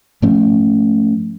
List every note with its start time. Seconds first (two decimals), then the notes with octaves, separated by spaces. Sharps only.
0.22 G#2 F3 A3 C#4